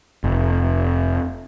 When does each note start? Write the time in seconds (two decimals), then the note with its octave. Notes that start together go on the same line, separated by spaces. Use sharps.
0.24 F1